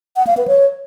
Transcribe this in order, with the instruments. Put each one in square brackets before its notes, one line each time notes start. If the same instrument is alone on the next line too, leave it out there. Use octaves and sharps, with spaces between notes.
[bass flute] F#5
F5
B4
C#5